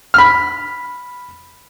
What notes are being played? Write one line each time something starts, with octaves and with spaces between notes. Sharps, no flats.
B5 F6